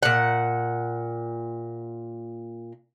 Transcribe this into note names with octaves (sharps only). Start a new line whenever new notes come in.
A#2 F#5